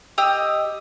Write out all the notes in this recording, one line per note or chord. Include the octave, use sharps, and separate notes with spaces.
G4 D#5 E6